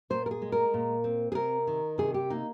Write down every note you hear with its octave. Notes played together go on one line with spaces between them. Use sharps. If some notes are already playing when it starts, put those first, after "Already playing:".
A#2 C5
A#4
G#4
G#3
A#4
A#2
C4
G#4
C3 A#4
D#3
C3 G#4
G4
A#3 D#4